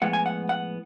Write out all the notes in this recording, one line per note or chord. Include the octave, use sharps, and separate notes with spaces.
A2 F3 G#3 B3 F#5
G#5
F#5
F#5